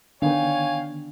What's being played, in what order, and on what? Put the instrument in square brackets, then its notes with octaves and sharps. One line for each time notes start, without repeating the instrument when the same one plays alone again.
[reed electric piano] D3 D#3 B3 [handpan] D4 [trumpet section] C#5 G5 G#5 [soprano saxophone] F5